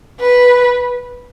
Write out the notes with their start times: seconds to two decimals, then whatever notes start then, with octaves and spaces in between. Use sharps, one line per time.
0.20 B4